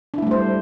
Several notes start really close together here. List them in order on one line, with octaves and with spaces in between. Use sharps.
D4 E4 A3 G3 C5